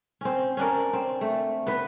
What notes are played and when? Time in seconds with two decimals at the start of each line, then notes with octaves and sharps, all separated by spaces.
0.21 C4 C#4
0.57 C#4 D4 A#4
0.93 C4
1.21 A3
1.67 B3 B4